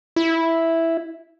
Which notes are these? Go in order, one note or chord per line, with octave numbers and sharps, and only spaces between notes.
E4